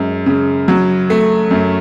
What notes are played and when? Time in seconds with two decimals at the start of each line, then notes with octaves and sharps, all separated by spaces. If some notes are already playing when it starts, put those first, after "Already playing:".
Already playing: F#2 G#3
0.26 C#3
0.68 F#3
1.10 A3
1.51 F#2